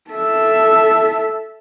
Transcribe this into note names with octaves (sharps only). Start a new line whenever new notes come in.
A4 E5